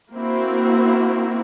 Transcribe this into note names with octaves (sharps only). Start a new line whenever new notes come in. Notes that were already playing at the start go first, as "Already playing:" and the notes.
A#3 C4 E4 F#4